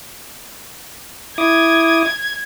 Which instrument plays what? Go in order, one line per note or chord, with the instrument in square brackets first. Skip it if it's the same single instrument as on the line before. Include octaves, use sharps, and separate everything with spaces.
[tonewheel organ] E4 D6 D#6 [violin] G#6